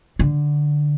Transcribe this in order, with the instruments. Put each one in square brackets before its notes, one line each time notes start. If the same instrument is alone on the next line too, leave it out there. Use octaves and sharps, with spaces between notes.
[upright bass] D3